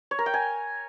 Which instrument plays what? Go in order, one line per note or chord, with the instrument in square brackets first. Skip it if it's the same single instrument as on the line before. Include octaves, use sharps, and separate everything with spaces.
[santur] C#5
A#4
G5
G#5